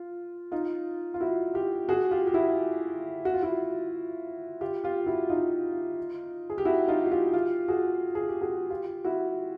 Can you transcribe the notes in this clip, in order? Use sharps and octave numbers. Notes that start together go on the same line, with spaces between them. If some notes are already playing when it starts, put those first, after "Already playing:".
Already playing: F4
D#4 F4
F4
E4 F#4
F4 G4
F#4 G#4
F4 G4
G4
E4 F#4
F#4
F4
E4 F#4
F4 G4
F4 G4
E4 F#4
D#4 F4
G#4
G4
E4 F#4
D#4 F4
F#4
F4 G4
F4 G4
F#4 G#4
G#4
G4
F#4 G#4
F4 G4
E4 F#4